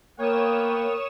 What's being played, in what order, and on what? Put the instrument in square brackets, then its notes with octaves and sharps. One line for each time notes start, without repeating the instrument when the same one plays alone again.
[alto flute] A#3 [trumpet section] B3 F5 G5 [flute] A#4 [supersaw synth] C#5 D#6 E7